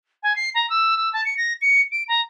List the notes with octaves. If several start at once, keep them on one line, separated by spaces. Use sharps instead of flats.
G#5
C7
A#5
E6
E6
A5
C#7
A#6
C#7
D7
A#5